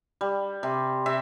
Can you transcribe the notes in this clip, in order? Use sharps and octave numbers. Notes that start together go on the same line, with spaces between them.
G3
C3
C3 E5